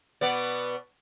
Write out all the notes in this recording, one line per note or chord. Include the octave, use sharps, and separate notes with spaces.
B2 B3 D5